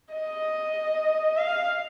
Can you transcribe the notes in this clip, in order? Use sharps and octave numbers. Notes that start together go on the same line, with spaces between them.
D#5
F5